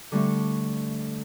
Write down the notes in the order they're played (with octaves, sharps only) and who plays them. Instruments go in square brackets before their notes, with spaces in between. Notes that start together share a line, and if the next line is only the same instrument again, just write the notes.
[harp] D3 G3 A3 C#6